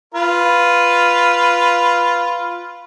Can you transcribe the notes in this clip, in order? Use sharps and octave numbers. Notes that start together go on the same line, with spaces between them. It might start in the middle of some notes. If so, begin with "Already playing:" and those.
F4 B4